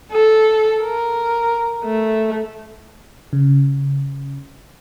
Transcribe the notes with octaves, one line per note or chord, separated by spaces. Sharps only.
A4
A#4
A3
C#3